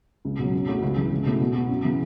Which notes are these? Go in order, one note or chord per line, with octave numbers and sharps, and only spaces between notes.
C#2
B2 F#3
F#2
C#3 A3 C#4 F#4
C#2
C#3 E3
C#2
B2 A3 C#4 E4
B2
B3 F#4
F#2
C#3 E3 B3